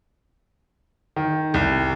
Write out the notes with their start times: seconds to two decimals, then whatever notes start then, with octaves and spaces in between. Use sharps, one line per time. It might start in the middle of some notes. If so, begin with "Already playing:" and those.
1.16 D#3
1.54 C2